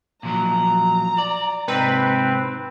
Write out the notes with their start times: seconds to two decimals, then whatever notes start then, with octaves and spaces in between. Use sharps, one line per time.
0.23 A#2 F3 F#3 A#5
1.18 D5
1.68 G#2 C3 C4 D#4 B4